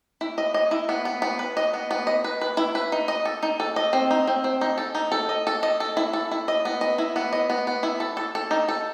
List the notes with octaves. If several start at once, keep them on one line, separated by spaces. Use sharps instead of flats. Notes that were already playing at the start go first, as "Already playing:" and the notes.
E4
D#5
D#5
E4
B3
B3
B3
B4
D#5
B3
B3
D#5
B4
B4
E4
B4
D#4
D#5
A4
D#4
A4
D#5
C4
D#4
C4
C4
D#4
A4
D#4
A4
D#5
A4
D#5
A4
E4
A4
E4
D#5
B3
D#5
E4
B3
D#5
B3
B3
E4
A4
A4
A4
D#4
A4